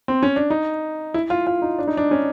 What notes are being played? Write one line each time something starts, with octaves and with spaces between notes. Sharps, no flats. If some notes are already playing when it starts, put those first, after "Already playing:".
C4
C#4
D4
D#4
E4
F4
F4
D#4
D4
D#4
D4
C#4